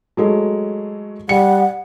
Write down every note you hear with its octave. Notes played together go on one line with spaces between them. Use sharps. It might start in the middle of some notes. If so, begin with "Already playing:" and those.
F#3 G#3 A3
G3 F#5 C#7